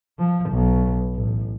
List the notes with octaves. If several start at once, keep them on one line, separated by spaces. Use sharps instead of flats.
F3
B1
A1